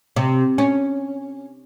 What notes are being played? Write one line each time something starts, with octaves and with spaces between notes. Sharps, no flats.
C3
C#4